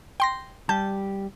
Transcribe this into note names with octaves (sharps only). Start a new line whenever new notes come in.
G5 C6 A#6
G3 G4 A5 G6